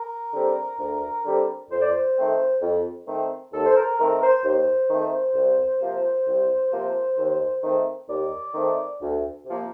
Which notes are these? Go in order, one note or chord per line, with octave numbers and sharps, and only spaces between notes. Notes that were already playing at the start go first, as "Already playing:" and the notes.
Already playing: A#4
D3 G3 C4
D2
D3 G3 C4
F2 C5
D5
C5
D#3 A3 C4
F2
D#3 A3 C4
D#2 A4
C5
A#4
D#3 A3 C4 A#4
C5
D#2 C5
D#3 A3 C4
C2
C3 F3 A#3
C2
C3 F3 A#3
D#2
D#3 A3 C4
D#2 D5
D#3 A3 C4
D2
C3 F3 A#3